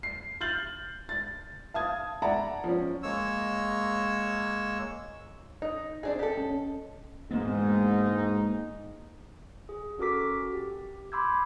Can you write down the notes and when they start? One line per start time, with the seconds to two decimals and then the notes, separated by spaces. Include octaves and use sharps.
0.03 C7
0.41 F6 G6 A6 F#7
1.09 A6
1.74 F5 A5 D#6 G#6
2.22 D5 E5 F#5 A5 A#5
2.64 F3 C#4
3.03 G#3 A#3 C#5 E6
5.62 D#4 D#5
6.03 C4 D4 G#4
6.19 G4 A4
6.37 C#4
7.31 E1 G#2 A#3 B3 D#4
9.69 G#4
9.98 C#4 F#4 A4 A#4 D6 B6
10.53 G4
11.12 B5 C6 D6 E6 G6 G#6